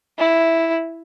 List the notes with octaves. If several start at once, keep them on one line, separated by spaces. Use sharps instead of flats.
E4